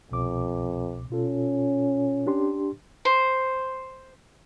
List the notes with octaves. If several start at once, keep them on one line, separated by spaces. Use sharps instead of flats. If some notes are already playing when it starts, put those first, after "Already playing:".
C2 F2 B2 D6
B2 C#4 F4 A4
D4 G4 C6
C5